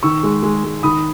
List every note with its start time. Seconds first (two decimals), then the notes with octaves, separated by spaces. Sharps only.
0.03 D#3 C#6 E6
0.23 G#3
0.43 G#3
0.64 G#3
0.83 D#3 B5 D#6